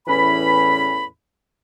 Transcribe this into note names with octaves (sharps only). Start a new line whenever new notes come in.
E2 A2 E3 C#4 B5